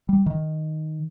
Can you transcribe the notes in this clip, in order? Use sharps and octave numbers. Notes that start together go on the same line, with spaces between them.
G3
D#3